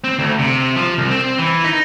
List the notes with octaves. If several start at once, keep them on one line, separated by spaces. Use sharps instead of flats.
C4
D2
C3
F3
C2
C4
E3
D#4